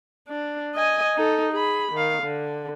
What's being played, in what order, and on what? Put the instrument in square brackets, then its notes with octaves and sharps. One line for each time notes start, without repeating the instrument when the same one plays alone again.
[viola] D4
D#5 G#5
D#4 A4
G#4 B5
D#3 F5
D3